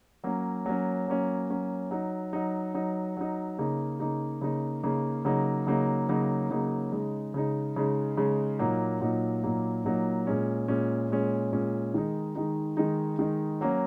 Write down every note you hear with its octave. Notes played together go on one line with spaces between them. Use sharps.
F#3 A#3 C#4
F#3 A#3 C#4
F#3 A#3 C#4
F#3 A#3 C#4
F#3 D#4
F#3 D#4
F#3 D#4
F#3 D#4
C#3 A#3 D#4
C#3 A#3 D#4
C#3 A#3 D#4
C#3 A#3 D#4
C#3 F#3 A#3 D#4
C#3 F#3 A#3 D#4
C#3 F#3 A#3 D#4
C#3 F#3 A#3 D#4
C#3 G#3 D#4
C#3 G#3 D#4
C#3 G#3 D#4
C#3 G#3 D#4
A#2 F#3 A#3 D#4
A#2 F#3 A#3 D#4
A#2 F#3 A#3 D#4
A#2 F#3 A#3 D#4
A#2 G#3 C#4
A#2 G#3 C#4
A#2 G#3 C#4
A#2 G#3 C#4
D#3 G#3 D#4
D#3 G#3 D#4
D#3 G#3 D#4
D#3 G#3 D#4
F#3 A#3 C#4